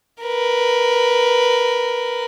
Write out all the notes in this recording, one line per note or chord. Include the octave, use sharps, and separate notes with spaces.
A#4 B4